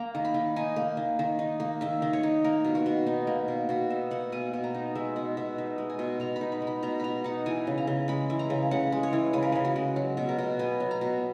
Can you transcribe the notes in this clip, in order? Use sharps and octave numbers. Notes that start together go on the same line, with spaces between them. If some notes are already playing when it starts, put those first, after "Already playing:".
Already playing: A#3 A#5
D#3
B5
D#3
D#4 G#5
A#3
D#3
D#3
D#4
A#3
D#3 E5
D#3
C#5
D#4
A#3 A#4
B2
F#4
B2
D#4
A#3
B2
B2 F#4
D#4 E5
A#3 F#5
B2 G#5
B2
A#5
D#4
G#3 E5
B2 F#5
B2 E5
D#4 E5
G#3
G#5
B2
B2 A#5
B5
D#4
B5
G#3
B5
B2 A#5
B2 A#5 B5
D#4 F#5
E3 G#5
C#3
A#5
C#3
G#3 B5
E3
A#5
C#3
C#3 F#5
G#3
C#5
E3
C#3 B4
A#4
C#3 B4
F#4
G#3
F#3
B2
A#4
B2
B3 G#5
F#3
A#5
B2